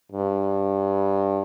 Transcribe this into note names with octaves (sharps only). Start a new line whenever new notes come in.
G2